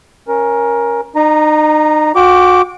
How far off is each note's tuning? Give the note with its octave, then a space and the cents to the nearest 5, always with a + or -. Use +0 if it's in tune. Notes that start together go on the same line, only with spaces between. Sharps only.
C#4 -5 A#4 +15
D#4 -35 A#5 +0
F#4 -30 G5 +0 D6 -10